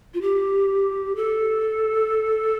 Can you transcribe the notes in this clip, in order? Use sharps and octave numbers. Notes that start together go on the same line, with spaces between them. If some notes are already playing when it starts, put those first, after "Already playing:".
F4
G4
A4